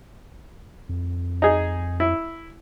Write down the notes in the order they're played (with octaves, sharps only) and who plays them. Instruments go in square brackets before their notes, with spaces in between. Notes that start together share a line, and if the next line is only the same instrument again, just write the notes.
[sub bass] F2
[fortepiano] D#4 G#4
E4